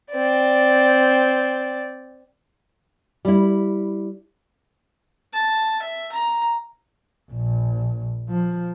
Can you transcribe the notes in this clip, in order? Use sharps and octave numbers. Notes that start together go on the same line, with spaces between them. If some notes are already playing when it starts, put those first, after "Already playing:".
C4 D5
G3 E4
A5
E5
A#5
A#1
F3